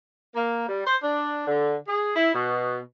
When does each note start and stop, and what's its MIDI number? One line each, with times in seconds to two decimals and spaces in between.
0.35 0.66 58
0.69 0.81 55
0.87 0.97 72
1.03 1.46 62
1.47 1.76 50
1.88 2.12 68
2.16 2.34 64
2.34 2.79 47